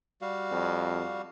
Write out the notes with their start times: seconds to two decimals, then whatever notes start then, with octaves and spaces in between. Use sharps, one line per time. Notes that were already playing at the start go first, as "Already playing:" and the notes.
0.21 G3 F#4 F5
0.52 F2